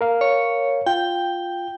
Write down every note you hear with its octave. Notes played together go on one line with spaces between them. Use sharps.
A#4 F5
C#5
F4 G5